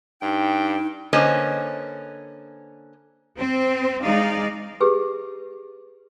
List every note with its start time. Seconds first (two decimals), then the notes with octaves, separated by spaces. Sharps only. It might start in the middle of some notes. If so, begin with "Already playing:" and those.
0.22 G2 D#4 G5
1.13 D3 A#3 B3 C#4 C5 D#5
3.38 C4
4.03 G#3 D#4 D5 F5
4.80 G4 G#4 B4